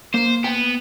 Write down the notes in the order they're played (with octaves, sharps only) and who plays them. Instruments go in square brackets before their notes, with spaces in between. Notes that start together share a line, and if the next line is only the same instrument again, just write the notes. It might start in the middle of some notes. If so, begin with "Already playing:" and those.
[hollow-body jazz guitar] A#3 [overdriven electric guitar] C5
[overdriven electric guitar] B3 [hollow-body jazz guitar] G5